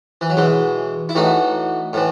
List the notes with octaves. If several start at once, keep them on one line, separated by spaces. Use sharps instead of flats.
E3
F#3
B2 E3 G#3
E4
A2 E3 D#4 F#4
A2 E3